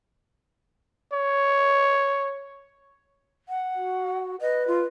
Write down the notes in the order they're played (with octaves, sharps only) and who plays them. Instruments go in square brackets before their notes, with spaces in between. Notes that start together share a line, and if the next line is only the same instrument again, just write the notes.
[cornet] C#5
[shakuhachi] F#5
[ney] F#4
[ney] B4 [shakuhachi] D#5
[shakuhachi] F4